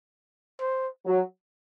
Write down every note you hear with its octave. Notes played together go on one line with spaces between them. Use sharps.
C5
F#3